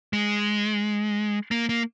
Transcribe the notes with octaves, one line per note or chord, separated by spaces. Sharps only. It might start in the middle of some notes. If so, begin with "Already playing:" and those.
G#3
A#3
A#3